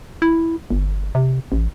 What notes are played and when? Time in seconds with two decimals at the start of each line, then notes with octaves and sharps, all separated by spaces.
0.22 E4
0.70 G1
1.15 C3
1.52 A1